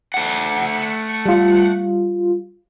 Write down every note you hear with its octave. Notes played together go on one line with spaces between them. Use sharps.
A3 F#5
G3 F4